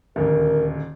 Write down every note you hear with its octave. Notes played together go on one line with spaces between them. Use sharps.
D#1 D2 A#4